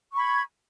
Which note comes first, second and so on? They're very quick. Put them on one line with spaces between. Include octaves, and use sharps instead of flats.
C#6 B5 G#6